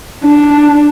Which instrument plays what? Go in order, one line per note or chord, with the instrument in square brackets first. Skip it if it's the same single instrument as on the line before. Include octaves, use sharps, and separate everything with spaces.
[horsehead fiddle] D4